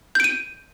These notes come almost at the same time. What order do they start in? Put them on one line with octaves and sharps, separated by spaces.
G6 D7 D#7